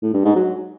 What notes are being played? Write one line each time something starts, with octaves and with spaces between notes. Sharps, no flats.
A2
G2
G#2
F#3